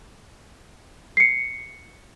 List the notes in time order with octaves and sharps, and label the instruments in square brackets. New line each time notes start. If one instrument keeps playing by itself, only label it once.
[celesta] C7 C#7